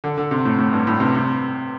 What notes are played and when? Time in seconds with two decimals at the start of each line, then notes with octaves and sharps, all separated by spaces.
0.04 D3
0.18 D3
0.31 C3
0.45 A2
0.58 A2
0.73 G2
0.87 A2
1.00 C3
1.15 C3